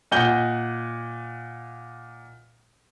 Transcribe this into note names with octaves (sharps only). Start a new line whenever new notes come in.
A#2 D#5 F#5 G6 G7